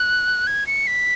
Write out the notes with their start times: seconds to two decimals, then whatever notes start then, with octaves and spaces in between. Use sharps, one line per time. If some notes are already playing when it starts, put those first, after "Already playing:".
Already playing: F#6
0.47 G#6
0.67 C#7
0.87 B6